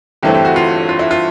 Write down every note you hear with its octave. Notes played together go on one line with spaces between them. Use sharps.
G1 G2 E3 A3 C4 G4
G4
F#4
F4
F4
E4
F4